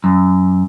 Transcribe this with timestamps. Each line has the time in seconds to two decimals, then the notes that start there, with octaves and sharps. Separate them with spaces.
0.04 F#2